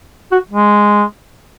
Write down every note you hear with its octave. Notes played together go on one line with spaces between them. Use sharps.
F#4
G#3